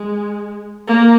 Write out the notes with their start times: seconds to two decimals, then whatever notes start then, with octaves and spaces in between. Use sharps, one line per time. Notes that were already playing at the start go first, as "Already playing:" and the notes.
Already playing: G#3
0.87 A#3